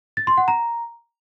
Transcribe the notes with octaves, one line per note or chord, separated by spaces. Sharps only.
A6
C6
F#5
A#5